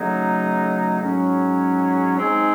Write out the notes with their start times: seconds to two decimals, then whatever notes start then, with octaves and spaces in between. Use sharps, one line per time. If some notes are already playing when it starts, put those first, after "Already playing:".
Already playing: C#3 F#3 A3 D#4
1.00 G#2 F#3 C#4
2.18 G#3 C4 D#4 G#4